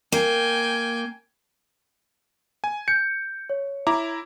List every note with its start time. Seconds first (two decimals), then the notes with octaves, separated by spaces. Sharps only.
0.12 A#3 G5 G#5
2.64 G#5
2.88 G6 C#7
3.50 C#5
3.87 E4 A#5 D6